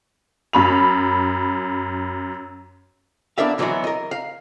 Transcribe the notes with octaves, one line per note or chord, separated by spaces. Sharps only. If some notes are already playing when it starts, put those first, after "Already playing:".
F#2 B5 F7
B3 D4 E4 A#4 E5 F5
D2 E3 F#3 G#3 B3 F#4
A#4 D#5
F5